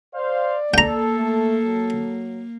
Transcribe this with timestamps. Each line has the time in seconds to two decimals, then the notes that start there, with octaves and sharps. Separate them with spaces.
0.15 C5 D5 F5
0.74 A#3 A4 G5 A#5
1.16 A3
1.63 F#3